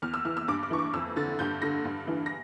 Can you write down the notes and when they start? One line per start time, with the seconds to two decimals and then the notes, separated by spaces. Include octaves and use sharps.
0.02 E2 F6
0.14 E6
0.25 E3 F6
0.37 E6
0.48 G2 D6
0.63 D6
0.70 E3 C#6
0.79 D6
0.94 F2 E6
1.16 D3 A6
1.39 G2 G6
1.62 D3 A#6
1.85 G2
2.08 E3
2.26 A#6